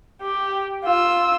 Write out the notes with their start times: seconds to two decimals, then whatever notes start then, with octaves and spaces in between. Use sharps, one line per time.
0.22 G4
0.84 F4 E6